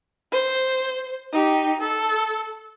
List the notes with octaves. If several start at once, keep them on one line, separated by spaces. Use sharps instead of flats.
C5
D#4 G4
A4